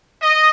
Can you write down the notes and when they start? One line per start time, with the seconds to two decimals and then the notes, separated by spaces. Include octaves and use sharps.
0.22 D#5